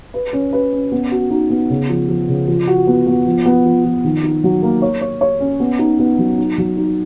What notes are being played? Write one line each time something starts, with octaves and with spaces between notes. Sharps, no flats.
B4
C#4
B4
C#4
B3
F#4
D#4
B3
C#3
F3
F3
C#3
F3
F#4
B3
B3
F3
B3
F3
F3
D#3
D#4
F#3
A#3
C#5
C#5
C#5
C#4
B3
D#4
B3
F#3
D#4
F#3
D#4